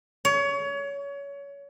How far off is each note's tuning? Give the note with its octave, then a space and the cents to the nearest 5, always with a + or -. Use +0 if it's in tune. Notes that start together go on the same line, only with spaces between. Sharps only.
C#5 +25